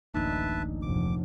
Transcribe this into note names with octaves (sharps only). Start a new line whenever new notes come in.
D1 A1 A#3 D4 D#4 B4 E5 A5
F1 A#1 D6